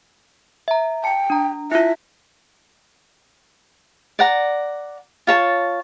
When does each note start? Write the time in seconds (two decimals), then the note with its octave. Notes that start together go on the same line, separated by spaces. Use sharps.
0.68 E5 A#5
1.04 G5 A5 C#7
1.30 D4 A#5
1.72 E4 F4 E5
4.19 D5 F#5 A#5
5.27 F4 C#5 A5